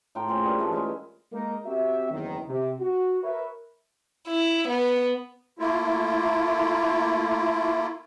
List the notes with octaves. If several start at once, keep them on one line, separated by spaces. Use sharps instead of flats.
A2 F4 G5 A#5
A#3 C4 C#4 G#4
G2 C#4 B4
E3 F3 A3 A#3
G#3 C#4 E4
G#3 A#3 D#4 A#4
C4 F#4 G4 E5
F#1 E2 D#3
C3
F#4
A#4 B4 C#5 E5
E4
B3
A3 A#3 E4 F4